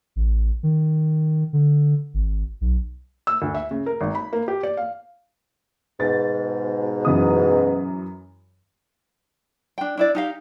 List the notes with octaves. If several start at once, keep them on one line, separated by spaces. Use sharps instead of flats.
A1
D#3
D3
G#1
B1
E6
D2
E5
C#3
A#4
G#1
B5
A#3
G4
D5
F5
G#2 B2 A6
F#2 E3 D#6
D4 G5
D4 E4 D5
D#4 G4 F5